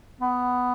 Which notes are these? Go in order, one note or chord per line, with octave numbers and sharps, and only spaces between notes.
B3